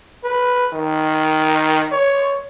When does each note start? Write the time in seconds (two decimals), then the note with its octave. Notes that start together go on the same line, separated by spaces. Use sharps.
0.24 B4
0.73 D#3
1.92 C#5